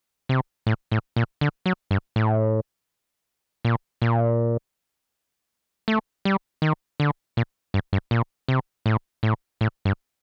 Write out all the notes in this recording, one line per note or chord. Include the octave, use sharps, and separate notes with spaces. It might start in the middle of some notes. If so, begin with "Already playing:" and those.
C3
A2
A2
A#2
D3
F#3
G2
A2
A#2
A#2
A3
G3
D#3
D3
A#2
G2
G2
A#2
C3
A2
A2
A2
G2